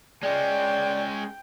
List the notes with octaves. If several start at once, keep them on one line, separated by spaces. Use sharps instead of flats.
G#3 C#4 D5 G5